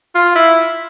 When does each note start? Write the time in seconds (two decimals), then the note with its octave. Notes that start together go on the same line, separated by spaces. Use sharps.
0.15 F4
0.36 E4